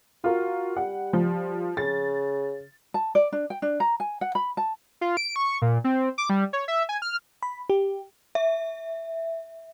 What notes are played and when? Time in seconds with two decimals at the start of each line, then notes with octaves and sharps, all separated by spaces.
0.24 F4 F#4 A#4
0.77 G3 F#5
1.13 F3
1.77 C#3 A6
2.94 A5
3.15 D5
3.32 D4
3.50 G5
3.62 D4
3.80 A#5
4.00 G#5
4.21 F#5
4.35 B5
4.57 A5
5.01 F4
5.17 D7
5.36 C#6
5.62 A#2
5.84 C4
6.18 D6
6.29 G3
6.53 C#5
6.68 E5
6.89 G#5
7.02 F6
7.43 B5
7.70 G4
8.35 E5